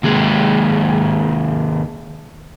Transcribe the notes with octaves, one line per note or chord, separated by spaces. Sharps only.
D#2 G#3